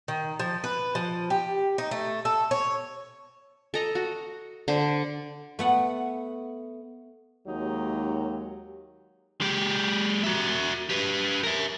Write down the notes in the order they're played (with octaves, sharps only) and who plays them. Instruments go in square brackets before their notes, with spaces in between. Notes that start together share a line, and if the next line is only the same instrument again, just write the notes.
[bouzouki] D#3
F3
B4
F3
G4
D#4
A3
A4
C#5
[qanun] A4 D#5 A#5
F#4
D3 C5
[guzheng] A3 B3 F#5
[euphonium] D#2 [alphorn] F#3 [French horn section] G#3 G4 [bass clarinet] D#4
[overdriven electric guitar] G#3 G4
F#4 E5
G4 B4
A#4 E5